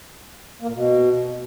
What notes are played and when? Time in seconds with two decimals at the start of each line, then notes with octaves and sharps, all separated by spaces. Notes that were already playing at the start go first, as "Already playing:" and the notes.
0.61 A#3
0.68 A#2
0.74 B2